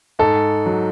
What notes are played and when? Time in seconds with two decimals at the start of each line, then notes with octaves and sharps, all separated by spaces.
0.19 G#2 A4
0.66 F#3